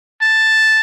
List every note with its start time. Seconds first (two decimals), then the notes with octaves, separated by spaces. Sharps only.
0.22 A5